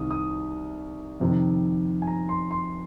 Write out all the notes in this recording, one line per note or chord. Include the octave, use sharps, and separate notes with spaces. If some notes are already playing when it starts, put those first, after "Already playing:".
Already playing: C2 C3 D#3 D#6
D#6
F2 C3 D#3
G#5
A#5
C6
C6